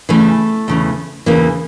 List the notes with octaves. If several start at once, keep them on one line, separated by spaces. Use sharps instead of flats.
E2 C#3 E3 A3
E2 C#3 E3
E2 C#3 E3 A#3